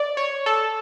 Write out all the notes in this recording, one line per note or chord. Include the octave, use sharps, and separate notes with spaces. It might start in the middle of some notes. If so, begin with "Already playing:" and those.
Already playing: D5
C#5
A4